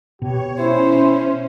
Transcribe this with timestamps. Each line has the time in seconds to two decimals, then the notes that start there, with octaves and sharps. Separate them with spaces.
0.22 B2 G4 C#5
0.59 C#4 E4 C5